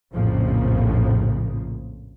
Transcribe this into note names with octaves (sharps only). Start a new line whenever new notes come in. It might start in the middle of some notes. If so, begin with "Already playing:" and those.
A#1 F2 A2 C#3 F3 A#3